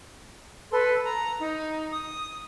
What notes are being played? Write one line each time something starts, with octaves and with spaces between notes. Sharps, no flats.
A4 B4 C6
A#5
D#4
D#6